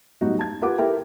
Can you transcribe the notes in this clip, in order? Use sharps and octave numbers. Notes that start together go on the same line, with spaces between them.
A2 F#3 G3 B3 D#4 F#4
A5 G#6
F4 G4 B4 F#5 D6
E4 G4 A4 A#4 E5 G5